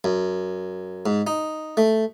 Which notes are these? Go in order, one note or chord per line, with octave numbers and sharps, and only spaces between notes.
F#2
G#2
D#4
A3